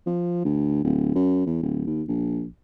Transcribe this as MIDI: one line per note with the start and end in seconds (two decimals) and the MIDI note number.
0.06 0.39 53
0.44 0.80 38
0.84 1.12 26
1.15 1.42 42
1.46 1.57 40
1.62 1.82 26
1.86 2.02 39
2.08 2.46 34